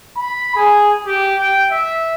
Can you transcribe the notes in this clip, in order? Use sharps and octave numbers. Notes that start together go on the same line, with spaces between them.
B5
G#4
G4
G5
E5